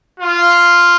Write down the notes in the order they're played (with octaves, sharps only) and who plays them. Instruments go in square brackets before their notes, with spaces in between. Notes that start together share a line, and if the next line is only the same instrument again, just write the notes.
[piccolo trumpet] F4